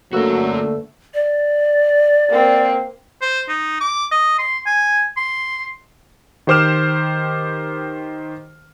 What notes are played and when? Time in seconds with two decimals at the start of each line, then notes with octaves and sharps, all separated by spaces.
0.13 D3 F#3 A3 A#3 F#4 A#4 B4 E6
1.14 D5
2.30 A#3 C4
3.22 C5
3.49 D#4
3.81 D6
4.11 D#5
4.38 C6
4.66 G#5
5.17 C6
6.47 D#3 G4 C5 D6 F6 E7